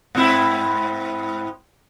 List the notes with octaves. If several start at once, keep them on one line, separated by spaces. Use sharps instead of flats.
G#2 C4 E4